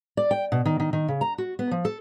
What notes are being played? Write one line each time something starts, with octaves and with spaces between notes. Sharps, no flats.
D5
G5
B2
D#3
D#3
D#3
C#3
A#5
F#4
B3
F3
A4